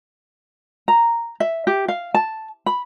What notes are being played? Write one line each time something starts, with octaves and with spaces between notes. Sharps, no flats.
A#5
E5
G4
F5
A5
B5